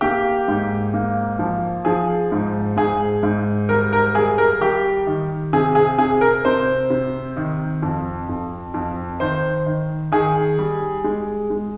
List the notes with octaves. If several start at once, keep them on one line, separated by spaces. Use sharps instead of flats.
A#3 G4
G#2
A#3
F3
F3 G#4
G#2
G#2 G#4
G#2
G3 A#4
A#4
G3 G#4
A#4
G3 G4
D#3
C3 G#4
G#4
C3 G#4
A#4
C3 C5
C3
D#3
F2
F2
F2
D#3 C5
D#3
D#3 G#4
G3
G#3
G#3